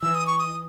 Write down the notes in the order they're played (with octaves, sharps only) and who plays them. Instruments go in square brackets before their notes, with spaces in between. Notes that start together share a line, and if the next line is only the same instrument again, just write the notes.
[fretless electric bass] E3 [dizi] E6
[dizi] D#6
C#6
D#6